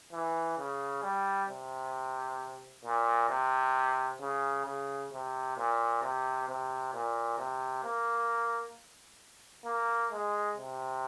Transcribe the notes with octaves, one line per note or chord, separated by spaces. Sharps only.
E3
C#3
G3
C3
A#2
C3
C#3
C#3
C3
A#2
C3
C3
A#2
C3
A#3
A#3
G#3
C3